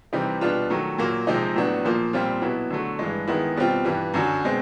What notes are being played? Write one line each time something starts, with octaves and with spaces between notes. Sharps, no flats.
C3 E3 G3 C4 D#4
B2 G3 B3 D4 F4
D#3 F#3 A3
A#2 F#3 A#3
C3 F3 G#3 C4 D#4
A2 F#3 B3 D4
A#2 F3 A#3
A#2 G3 C4 F4
B2 F#3 B3 E4
D3 F#3 A3
G2 E3 G#3
D#3 G#3 B3 E4
B2 G3 C4 F4
G2 E3 G3
F#2 D3 F#3
B2 G#3 C4